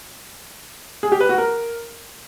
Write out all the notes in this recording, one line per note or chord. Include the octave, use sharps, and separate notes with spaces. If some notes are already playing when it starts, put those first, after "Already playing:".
G#4
G4
B4
F#4
A#4